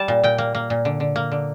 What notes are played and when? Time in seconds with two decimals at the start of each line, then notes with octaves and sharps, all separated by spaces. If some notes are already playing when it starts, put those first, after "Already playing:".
Already playing: G3 A5
0.08 A#2
0.24 A#2 G5
0.38 A#3
0.55 A#3
0.70 A#2
0.85 D3
1.00 D3
1.16 A#3
1.32 D3